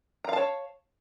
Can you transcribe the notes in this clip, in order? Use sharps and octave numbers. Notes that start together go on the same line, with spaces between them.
C#5 F5 A5 A#5